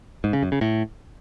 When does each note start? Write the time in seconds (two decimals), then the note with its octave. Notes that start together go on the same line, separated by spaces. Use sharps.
0.24 G#2
0.33 C#3
0.43 F#2
0.52 C#3
0.61 A2